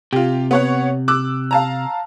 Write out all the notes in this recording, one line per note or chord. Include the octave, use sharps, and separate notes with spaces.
C3 F4 G4
B3 C#5 F#5
D6 E6 F#6
F5 A5 A#5